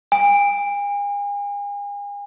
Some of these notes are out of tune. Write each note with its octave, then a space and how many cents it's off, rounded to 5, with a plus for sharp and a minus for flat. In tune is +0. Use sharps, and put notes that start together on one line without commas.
G#5 -40